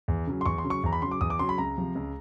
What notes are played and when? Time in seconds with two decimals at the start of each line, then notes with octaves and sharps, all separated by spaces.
0.08 E2
0.27 C#3 F#3
0.41 C6
0.46 E2 C#6
0.58 C6
0.64 C#3 F#3
0.70 C#6
0.83 E2 A#5
0.93 B5
1.02 C#3 F#3 C6
1.11 D6
1.21 E2 D#6
1.30 D6
1.39 C#3 F#3 C6
1.49 B5
1.58 C#2 A#5
1.77 C3 F3
1.95 C#2